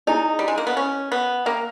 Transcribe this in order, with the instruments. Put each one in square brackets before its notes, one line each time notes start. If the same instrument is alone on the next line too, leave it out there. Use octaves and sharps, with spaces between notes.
[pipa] D#4 [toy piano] E4 G#4 D#5 G#5
[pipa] G3
G#3
A#3
B3
C#4
B3
[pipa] A#3 [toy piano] A#4 E5 G5